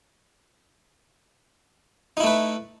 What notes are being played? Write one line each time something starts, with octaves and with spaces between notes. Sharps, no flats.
A3 D#4 E4 B4